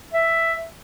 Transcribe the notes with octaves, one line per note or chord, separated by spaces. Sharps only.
E5